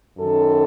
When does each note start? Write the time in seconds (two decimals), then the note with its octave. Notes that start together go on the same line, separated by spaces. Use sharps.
0.18 F#2 D#3 A4